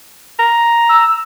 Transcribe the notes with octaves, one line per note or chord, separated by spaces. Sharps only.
A#5
E6